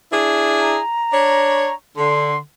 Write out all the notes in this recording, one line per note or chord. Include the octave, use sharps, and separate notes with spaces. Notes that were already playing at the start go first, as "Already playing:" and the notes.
D4 E4 G#4
A#5
D4 C#5
D3 C6